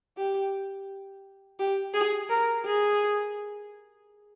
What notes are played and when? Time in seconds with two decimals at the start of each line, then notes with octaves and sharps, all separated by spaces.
0.18 G4
1.59 G4
1.94 G#4
2.29 A#4
2.65 G#4